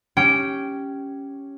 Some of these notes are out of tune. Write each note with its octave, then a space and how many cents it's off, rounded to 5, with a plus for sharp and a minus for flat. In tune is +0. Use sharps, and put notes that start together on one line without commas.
C#4 +0 G4 +0 G5 -20